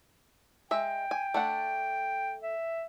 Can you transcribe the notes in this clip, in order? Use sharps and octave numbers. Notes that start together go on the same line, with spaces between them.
G#3 E5 G5
G#5
A3 D4 F#5
E5